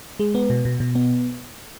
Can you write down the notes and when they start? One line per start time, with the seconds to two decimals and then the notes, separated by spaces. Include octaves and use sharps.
0.20 G#3
0.35 B3
0.50 B2
0.65 B2
0.80 B2
0.95 B3